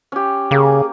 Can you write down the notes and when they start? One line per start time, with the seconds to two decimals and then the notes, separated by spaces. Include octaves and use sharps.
0.12 C#4 G4
0.51 C#3 A#3 G#4